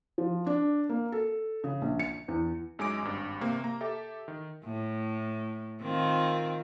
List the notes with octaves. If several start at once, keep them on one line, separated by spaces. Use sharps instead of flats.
F3
D4
A#3
A4
C#3
A#1
C#7
E2
F#2 G#3 D#4 G#5 D6 D7
G#1 G2
C3 A#3
A#3 A#5
G4 A4 E5
D#3
A2
D#3 C4 F4